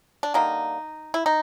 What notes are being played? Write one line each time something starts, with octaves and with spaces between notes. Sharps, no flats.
D4
D3 G3 A#3 D#4
E4
D#4